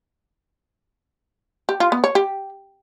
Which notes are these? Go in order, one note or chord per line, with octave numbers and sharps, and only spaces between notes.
G4
F4
B3
C#5
G4